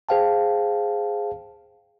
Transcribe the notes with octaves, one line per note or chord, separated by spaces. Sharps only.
G#4 C5 F5 G5 A5